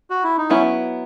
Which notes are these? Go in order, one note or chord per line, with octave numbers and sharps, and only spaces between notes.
F#4
E4
D#4
F#3 B3 C#4 E4